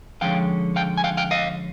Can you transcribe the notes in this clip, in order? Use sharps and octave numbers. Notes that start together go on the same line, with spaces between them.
D3 F3 G#3 C#4 F5 G5
F5 G5
G#5
F5 G5
F5 G5
D#5 F5